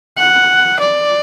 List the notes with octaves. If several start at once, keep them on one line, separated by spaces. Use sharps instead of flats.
F#5
D5